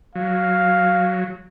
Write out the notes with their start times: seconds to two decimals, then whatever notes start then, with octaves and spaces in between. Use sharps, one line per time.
0.15 F#3 F5